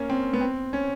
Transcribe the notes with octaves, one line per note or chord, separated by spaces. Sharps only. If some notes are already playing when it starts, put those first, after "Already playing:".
Already playing: A#3 C#4
C4
B3
C4
C#4